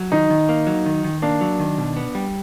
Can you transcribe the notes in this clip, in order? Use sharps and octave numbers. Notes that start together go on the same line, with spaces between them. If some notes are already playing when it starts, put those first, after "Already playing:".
Already playing: F#3
D#3 D#4
D#3
A#3
F#3
D#3
D#3
A#3 D4
F#3
D#3
B2
B3
G3